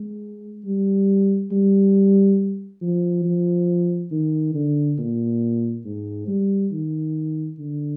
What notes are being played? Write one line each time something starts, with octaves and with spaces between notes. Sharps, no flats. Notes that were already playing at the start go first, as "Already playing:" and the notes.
Already playing: G#3
G3
G3
F3
F3
D#3
D3
A#2
G#2
G3
D#3
D3